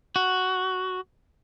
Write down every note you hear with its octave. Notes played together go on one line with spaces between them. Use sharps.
F#4